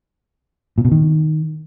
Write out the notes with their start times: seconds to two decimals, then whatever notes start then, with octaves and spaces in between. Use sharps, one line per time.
0.78 A#2
0.85 B2
0.92 D#3